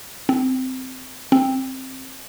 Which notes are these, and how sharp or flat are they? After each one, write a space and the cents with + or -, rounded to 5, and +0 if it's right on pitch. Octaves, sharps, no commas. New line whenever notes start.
C4 -15
C4 +10